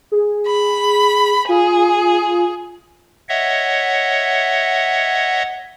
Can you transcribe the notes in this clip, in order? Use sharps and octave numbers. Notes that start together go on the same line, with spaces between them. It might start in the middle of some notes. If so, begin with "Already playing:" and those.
G#4
B5
F4 G#4
C#5 D#5 E5 F#5